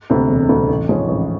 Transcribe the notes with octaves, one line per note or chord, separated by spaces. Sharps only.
D2 C3
E1
D2 C3
A1
G#2 F3 G#3 C#4
A1